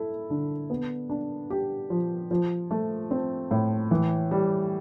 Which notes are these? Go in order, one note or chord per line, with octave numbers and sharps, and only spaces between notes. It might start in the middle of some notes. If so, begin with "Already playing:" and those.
Already playing: E4 A4
D3
B3
D4
G4
F3
F3
A3
C4
A2
E3
G3